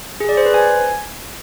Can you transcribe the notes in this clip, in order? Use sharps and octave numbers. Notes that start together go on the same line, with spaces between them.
G#4
D5
C5
B4
G#5